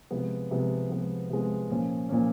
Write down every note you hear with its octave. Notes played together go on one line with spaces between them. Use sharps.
C3 F3 G#3 B3
C3 F3 G#3 B3
C3 F3 G#3 B3
C3 F3 G#3 B3
A#2 F3 A#3 C#4
A#2 F3 A#3 C#4